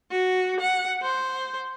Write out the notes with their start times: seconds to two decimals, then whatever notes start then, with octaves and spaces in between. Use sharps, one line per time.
0.11 F#4
0.60 F#5
1.02 C5